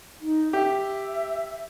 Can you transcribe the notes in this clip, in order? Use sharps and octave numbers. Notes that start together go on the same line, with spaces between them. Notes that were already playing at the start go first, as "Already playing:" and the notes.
D#4
G4 E5